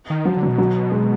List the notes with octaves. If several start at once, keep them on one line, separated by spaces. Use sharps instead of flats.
D#3
F3 F#3
D3
F#3
B2
F#3
G#3